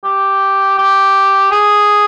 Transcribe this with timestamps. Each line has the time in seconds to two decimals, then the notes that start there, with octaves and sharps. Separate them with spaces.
0.04 G4
0.78 G4
1.51 G#4